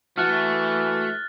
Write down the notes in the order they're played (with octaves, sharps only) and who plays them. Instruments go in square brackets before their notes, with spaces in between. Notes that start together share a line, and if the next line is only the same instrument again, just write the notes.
[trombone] E3 [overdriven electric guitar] A3 [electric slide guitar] F#4 [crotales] F6 F#6 A6